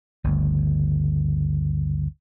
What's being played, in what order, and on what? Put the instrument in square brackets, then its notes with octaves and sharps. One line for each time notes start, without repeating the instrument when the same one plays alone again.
[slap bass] G1 D2 C#3